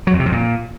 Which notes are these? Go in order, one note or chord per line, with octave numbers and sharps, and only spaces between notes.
F#3
F2
C3
F2
A#2